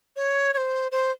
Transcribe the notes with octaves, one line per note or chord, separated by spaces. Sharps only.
C#5
C#5
C5
C5